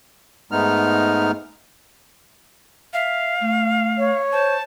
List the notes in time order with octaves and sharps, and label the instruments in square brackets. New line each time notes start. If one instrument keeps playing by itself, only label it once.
[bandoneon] G#2 G#3 A3 B3 D#4 F6
[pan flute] E5 [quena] F5
[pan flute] A3
[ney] C#5
[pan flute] C5 [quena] A5